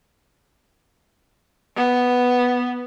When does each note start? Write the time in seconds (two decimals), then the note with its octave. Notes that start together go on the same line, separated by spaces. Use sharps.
1.77 B3